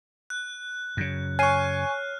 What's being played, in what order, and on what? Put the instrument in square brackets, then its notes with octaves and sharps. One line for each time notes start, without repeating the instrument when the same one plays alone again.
[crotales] F#6
[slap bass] F#2 C#3
[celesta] C#5 C7 D#7 [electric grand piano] G#5 C#6 [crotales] F6 F#6